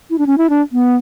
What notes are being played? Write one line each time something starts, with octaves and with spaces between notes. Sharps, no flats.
E4
D4
C#4
E4
D4
B3